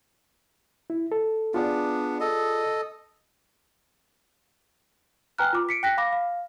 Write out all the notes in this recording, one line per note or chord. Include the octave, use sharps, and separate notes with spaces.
E4
A4
B3 D4 F4 G#4 D5
A4 D#5
B4 G5 G#5 A#5 F6 F#6
F4 D6
B6 C#7 D7
G5 F#6 A#6 B6
F5 B5 D6 A#6
F5